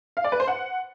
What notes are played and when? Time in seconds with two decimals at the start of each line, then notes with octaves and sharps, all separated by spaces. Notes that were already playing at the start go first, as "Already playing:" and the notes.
0.17 F5
0.24 D5
0.32 B4
0.40 C5
0.47 F#5